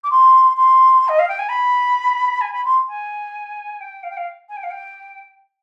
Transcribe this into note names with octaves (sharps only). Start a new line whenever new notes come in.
D6
C6
C6
D#5
F5
G5
G#5
B5
G#5
B5
C6
G#5
G5
F5
G5
F5
G#5
G5
F5
G5